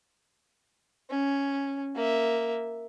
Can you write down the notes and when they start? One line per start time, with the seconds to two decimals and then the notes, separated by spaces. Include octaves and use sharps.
1.10 C#4
1.95 A#3 E5